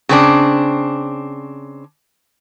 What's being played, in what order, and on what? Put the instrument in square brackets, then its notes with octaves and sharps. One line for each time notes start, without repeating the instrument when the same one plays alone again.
[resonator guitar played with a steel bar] C#3 C4 D4